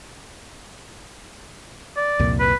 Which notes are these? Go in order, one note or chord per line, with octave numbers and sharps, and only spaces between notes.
D5
C2 F2 A#2
B4